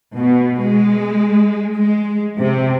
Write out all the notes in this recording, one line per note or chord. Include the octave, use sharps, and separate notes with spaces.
B2
G#3
G#3
C3